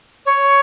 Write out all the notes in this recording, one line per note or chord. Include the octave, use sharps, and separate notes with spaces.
C#5